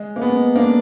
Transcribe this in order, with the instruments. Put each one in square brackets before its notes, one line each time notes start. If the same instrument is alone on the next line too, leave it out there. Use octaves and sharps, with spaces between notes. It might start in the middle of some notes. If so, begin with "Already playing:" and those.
Already playing: [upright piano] G#3
A#3
G#3 B3
A#3 D4